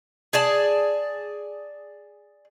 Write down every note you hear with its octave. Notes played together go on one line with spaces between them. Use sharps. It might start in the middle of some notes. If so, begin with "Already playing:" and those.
G#4 D5 A5